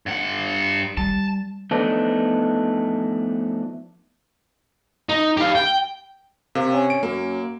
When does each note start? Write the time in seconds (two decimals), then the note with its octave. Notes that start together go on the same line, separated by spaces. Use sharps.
0.06 G2 F#5
0.97 G3 A5
1.71 F3 A3 B3 D4 D#4
5.09 D#4
5.37 G4 F5
5.55 G5
6.55 C3 A#3
6.73 C#4
6.90 D7
7.03 F#2 A#3